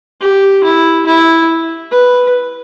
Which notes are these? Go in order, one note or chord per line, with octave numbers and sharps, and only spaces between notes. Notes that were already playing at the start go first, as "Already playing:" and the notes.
G4
E4
E4
B4